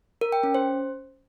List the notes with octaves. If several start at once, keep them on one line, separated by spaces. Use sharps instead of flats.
A#4
G5
C#4
C5